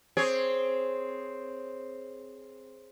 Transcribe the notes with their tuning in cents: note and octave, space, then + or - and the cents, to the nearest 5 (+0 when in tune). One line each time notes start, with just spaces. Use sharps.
C4 +0 G#4 +0 C#5 +0